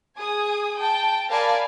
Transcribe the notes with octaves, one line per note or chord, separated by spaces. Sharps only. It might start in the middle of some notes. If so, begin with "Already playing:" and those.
G#4 G#5 D#6
G5 A5
A#4 D5 F5 G#5 A5 B5